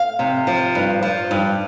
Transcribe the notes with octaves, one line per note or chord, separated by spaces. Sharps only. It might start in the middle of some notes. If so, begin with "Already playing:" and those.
Already playing: F5
C3
F3
G2
F3
G2